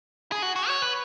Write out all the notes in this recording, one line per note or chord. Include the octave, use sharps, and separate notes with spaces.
G#4
F#4
F#4
C#5
B4